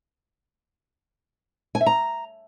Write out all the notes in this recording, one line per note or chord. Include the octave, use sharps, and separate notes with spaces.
G#5
E5
A#5